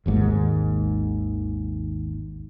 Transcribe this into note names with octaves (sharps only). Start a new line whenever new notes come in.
G#1 D#2 G#2